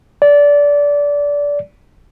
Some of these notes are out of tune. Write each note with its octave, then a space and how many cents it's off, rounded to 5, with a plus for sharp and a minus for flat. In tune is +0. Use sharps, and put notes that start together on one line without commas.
D5 -20